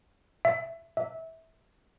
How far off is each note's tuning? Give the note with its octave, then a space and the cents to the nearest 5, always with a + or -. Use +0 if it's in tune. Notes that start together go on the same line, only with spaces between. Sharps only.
E5 +10
E5 -20